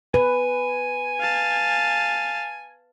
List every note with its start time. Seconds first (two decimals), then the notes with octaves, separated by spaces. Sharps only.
0.14 B4 G#5
1.21 F5 A5